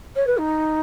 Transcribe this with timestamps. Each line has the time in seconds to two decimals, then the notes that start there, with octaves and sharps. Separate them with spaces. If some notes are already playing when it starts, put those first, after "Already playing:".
0.16 C#5
0.27 B4
0.37 D#4